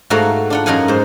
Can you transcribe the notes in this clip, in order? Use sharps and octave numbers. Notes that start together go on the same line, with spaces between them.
G#2 A3 F#4 A#4 F5
D4 F4 F#5
F#2 D#4 A#4 F5 F#5 G#5
G#2 C5